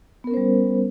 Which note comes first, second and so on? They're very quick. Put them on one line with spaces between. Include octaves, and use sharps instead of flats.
B3 A#4 C#4 C5 G3